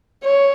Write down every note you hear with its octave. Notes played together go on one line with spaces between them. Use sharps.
C#5